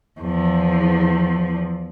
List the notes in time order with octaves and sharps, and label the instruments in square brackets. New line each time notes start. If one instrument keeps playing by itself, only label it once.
[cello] E2 F3